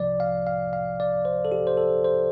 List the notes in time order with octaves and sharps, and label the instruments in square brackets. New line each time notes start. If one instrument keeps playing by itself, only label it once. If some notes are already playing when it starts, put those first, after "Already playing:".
Already playing: [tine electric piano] C2 C3 F3 D5
F5
F5
F5
D5
C5
A4
G4
C5
A4
C5